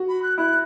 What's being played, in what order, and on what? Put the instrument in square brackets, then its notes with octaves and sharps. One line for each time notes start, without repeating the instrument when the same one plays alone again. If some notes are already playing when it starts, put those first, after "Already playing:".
Already playing: [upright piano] F#4
[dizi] B5
F#6
[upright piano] E4 [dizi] F#6